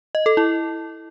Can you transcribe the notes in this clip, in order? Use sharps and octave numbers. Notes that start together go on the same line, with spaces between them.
D#5
A4
E4